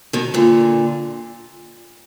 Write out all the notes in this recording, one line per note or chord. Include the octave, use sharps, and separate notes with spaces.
B2 D#3
A#2 D3